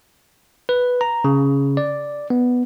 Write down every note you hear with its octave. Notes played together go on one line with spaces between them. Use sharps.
B4
A#5
C#3
D5
B3